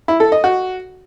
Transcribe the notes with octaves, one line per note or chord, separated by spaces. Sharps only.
E4
A4
D#5
F#4